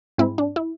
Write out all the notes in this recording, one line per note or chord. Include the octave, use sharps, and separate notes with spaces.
G#2 G#3 C4 E4
D4
E4